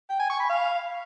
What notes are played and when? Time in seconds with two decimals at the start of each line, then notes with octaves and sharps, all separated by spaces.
0.10 G5
0.20 G#5
0.30 C#6
0.40 B5
0.50 F5